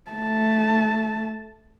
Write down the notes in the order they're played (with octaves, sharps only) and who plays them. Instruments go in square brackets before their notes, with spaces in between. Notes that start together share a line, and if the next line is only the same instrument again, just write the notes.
[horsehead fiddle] A3 A5